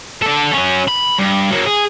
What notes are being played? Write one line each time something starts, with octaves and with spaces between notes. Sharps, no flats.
D4 A4
F#3 C#4
B5
G2
F#3 A#3
G#4